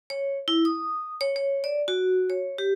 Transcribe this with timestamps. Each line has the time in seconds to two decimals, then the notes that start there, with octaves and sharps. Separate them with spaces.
0.10 C#5
0.48 E4
0.65 D#6
1.21 C#5
1.36 C#5
1.64 D5
1.88 F#4
2.30 C#5
2.58 G4